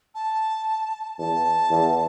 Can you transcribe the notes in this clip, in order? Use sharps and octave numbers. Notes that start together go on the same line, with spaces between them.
A5
E2 A5
E2